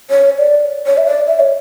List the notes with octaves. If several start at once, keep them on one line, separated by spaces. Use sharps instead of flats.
C#5
D5
C#5
E5
D5
E5
C#5